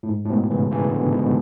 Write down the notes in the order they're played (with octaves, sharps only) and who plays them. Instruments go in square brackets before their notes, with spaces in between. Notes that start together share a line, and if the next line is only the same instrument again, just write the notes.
[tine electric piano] A2
G#2
A2
G#2 B2
C#3 E3
C#3 E3
B2 D3
G#2 B2